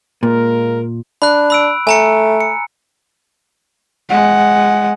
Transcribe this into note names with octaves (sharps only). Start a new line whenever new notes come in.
A#2 G#3 A#3 A#4
D4 B5 F#6
B5 E6 D7
A3 G#5 A#5 C#7
C#7
G#3 F#5